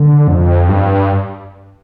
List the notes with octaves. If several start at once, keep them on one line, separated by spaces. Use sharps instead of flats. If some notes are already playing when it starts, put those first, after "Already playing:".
Already playing: D3
F2
G2